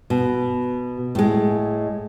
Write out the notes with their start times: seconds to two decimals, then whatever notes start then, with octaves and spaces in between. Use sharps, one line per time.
0.10 B2
1.15 A2 G#3